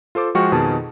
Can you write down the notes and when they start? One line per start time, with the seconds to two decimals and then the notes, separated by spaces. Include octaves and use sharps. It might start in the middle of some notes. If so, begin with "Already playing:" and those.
0.15 F4 A4 C5 D6
0.35 F3 G#3 F#4 G5 C#6 F6
0.52 F2 B2 D#3 G#4 A5